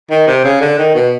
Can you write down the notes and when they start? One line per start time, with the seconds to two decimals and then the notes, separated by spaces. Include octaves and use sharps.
0.11 D#3
0.27 C3
0.44 C#3
0.61 D3
0.78 D#3
0.94 B2